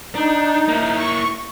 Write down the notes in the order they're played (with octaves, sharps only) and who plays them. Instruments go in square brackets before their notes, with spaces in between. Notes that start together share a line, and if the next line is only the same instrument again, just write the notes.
[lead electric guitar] D4 [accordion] D#4
[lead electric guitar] A#3 E4
[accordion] C#6